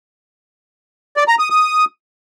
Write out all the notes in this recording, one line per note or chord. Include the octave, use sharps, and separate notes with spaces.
D5
A#5
D#6
D#6